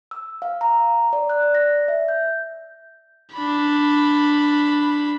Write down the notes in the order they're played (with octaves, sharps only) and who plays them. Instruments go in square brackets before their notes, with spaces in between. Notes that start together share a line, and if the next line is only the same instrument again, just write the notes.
[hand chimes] E6
F5
A#5
D5
F#6
D5
A#6
E5
G6
[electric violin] D4 B5